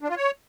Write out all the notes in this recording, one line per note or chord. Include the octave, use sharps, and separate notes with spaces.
D4
F4
C#5